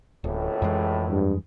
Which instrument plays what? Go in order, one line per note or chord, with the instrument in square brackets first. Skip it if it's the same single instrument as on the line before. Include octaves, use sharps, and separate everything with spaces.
[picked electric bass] D1 [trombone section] G#1 C#2 A2
[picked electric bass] F2 E3 G#3
[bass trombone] G2